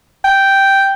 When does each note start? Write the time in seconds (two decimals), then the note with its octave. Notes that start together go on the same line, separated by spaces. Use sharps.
0.25 G5